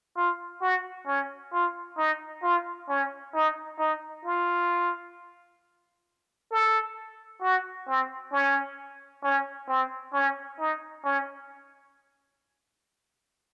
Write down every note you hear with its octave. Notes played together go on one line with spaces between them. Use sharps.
F4
F#4
C#4
F4
D#4
F4
C#4
D#4
D#4
F4
A4
F#4
C4
C#4
C#4
C4
C#4
D#4
C#4